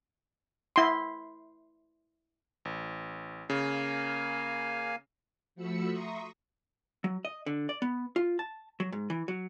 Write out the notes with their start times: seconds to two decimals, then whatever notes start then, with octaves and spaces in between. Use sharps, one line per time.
0.76 E4 C6
2.65 A1
3.50 C#3 A#3 F5 G#5
5.55 F3 A3 F#4 B5 E6 C#7
5.89 E5 A#5 C6 C#6 D#6
7.04 F#3
7.25 D#5
7.46 D3
7.69 D5
7.82 B3
8.16 F4
8.39 A5
8.80 F#3
8.92 G#2
9.10 E3
9.28 F#3